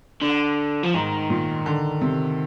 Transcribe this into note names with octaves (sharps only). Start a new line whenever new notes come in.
D3
F3
G#2 D#3
A#2
D3
C3